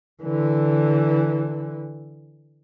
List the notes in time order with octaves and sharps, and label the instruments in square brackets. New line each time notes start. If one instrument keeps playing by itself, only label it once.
[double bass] D3 E3